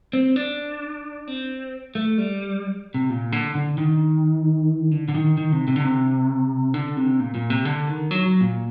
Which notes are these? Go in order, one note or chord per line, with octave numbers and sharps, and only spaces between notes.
C4
D4
C4
A3
G3
C3
A#2
D3
D3
D#3
D3
D3
D#3
D#3
C3
C3
D3
C3
D3
C3
A#2
A#2
C3
D3
D#3
F#3
F#3
A#2